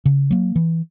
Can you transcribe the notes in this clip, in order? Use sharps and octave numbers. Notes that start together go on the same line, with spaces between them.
C#3
F#3 A#3
E3